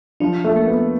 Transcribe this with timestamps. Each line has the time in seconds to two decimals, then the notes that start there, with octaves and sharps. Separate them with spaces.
0.20 F3 D4
0.45 A3
0.56 A#3
0.67 B3